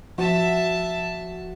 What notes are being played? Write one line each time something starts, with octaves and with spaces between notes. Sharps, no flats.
F3 F#4 E5 A5